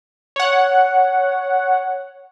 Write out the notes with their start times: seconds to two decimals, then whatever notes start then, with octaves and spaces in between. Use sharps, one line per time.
0.36 C#5 F#5